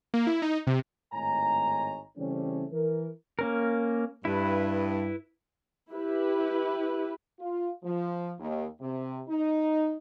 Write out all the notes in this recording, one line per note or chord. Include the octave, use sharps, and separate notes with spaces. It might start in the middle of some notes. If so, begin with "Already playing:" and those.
A#3
E4
D#4
C3
G#1 A2 D#4 C#5 G#5 A#5
C#3 E3 G3 A3 C4 C#4
E3 A#4
A#3 C#4 A#4
G2 E4 B4
E4 G4 B4
F4
F3
D#2
C3
D#4